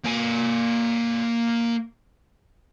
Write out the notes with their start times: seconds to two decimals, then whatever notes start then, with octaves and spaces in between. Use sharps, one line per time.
0.04 A#3 G#5